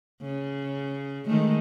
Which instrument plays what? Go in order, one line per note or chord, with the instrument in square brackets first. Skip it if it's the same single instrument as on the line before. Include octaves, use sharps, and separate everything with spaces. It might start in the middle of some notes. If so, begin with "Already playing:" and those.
[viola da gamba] C#3
D#3 G#3 A3